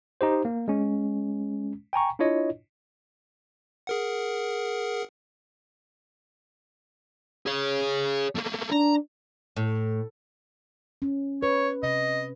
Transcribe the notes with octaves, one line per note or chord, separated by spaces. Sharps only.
D#4 G4 C5
A#3
G#3 C#4
G5 G#5 A#5 C#6
D4 E4 F4 C#5 D#5
G#4 A#4 F#5
G#4 C#5
A3 A#3
D4 A#5
A2
C#4
B4 C#5
C3 D#5